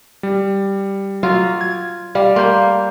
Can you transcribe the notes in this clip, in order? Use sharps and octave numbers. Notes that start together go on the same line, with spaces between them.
G3
F#3 F4
G#6
G3 F5
A#3 C6 G6